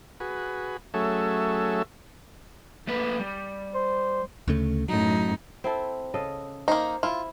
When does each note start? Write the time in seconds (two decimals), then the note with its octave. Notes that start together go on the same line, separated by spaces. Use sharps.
0.20 F#4 G#4 B4
0.94 F#3 A3 C#4 G#4 A4 E5
2.87 A3 A#3 B4
3.20 G3
3.74 C5
4.48 D2 C#3 A3
4.88 F#2 A2 F#3 D#4
5.64 C4 E4 A4
6.14 C#3 A4 D#5
6.68 A#3 D#4 C5
7.03 E4 F4